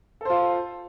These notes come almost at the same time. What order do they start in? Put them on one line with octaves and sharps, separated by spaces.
A4 C5 F4